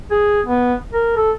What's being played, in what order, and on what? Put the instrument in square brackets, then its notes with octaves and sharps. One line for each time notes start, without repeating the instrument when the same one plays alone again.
[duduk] G#4
B3
A#4
A4